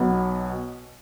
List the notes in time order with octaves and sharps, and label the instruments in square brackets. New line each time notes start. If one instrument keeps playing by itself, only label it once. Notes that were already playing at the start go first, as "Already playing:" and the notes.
Already playing: [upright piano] B1 B2 F#3 B3